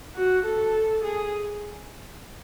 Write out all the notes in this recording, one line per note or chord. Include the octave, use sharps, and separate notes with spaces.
F#4
A4
G#4